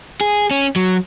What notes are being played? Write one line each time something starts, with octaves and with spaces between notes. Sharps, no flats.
G#4
C#4
F#3